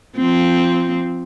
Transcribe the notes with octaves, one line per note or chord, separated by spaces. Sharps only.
F3 C4